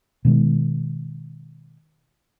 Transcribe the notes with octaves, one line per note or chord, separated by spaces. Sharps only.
B2 D#3 G#3